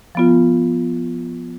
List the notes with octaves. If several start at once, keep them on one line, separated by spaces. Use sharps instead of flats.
F3 B3 F4